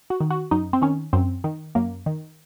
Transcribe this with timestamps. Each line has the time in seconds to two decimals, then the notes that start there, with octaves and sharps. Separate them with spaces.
0.10 F#4
0.20 D#3
0.30 F#4
0.51 F#2 D#4
0.73 C4
0.82 D#3 C#4
1.13 F#2 C4
1.44 D#3
1.75 F#2 A#3
2.06 D#3